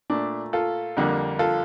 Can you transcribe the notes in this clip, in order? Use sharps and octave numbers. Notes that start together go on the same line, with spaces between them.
A#2 A3 D4
F4 A4
F2 D3 G3 A#3
F4 A4